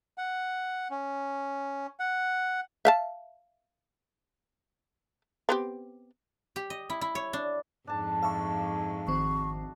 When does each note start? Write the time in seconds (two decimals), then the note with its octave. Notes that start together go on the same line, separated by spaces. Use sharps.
0.18 F#5
0.91 C#4
2.00 F#5
2.85 E5 F5 A5
5.49 B3 C4 G4
6.56 G4
6.70 D#5
6.90 E4
7.01 E4
7.15 C#5
7.33 D4
7.87 F2 G#2 D4 A5
8.22 D4 E5 F5 A5 C#6
9.07 G#1 D#3 C4 F#4 C#6